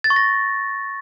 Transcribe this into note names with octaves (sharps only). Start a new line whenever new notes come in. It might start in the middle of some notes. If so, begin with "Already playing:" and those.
A6
C#6
A#6